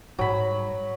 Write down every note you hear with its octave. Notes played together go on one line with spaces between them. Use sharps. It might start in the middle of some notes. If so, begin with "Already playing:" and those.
G#2 F#3 G3 B5